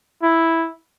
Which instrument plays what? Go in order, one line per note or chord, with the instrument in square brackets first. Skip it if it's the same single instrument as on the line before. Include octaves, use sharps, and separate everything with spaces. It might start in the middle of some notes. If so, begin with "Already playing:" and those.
[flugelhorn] E4